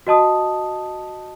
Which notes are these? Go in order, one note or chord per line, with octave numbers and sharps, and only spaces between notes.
F#4 D#5 A5 D#6